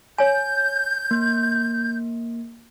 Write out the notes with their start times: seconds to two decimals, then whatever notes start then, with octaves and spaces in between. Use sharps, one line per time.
0.18 C#5 G#5 G6
1.11 A#3